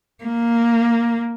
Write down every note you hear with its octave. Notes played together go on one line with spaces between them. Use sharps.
A#3